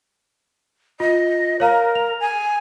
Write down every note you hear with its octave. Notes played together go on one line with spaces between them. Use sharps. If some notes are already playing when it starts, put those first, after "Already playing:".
F4 D#5
A#4 C#5 F5 A#5
F7
G#5